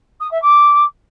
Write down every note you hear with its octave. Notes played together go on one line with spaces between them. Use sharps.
D#6
E5
D6